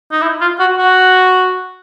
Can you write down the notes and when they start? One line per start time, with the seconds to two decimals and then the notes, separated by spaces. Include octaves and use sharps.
0.12 D#4
0.22 E4
0.41 F4
0.60 F#4
0.78 F#4